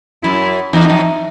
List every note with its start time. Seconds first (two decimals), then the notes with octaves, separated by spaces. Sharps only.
0.23 F#2 E4
0.73 E2 D#4
0.90 F2